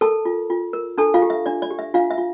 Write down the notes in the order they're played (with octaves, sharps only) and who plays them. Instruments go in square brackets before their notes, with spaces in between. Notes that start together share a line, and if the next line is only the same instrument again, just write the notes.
[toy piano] A4 A#4 A5
F4
F4
A#4
D4 A4 A5
F4 F5
G4
E5
D4 D5
D5
G4
E5
D4 F4 F5
E5
F4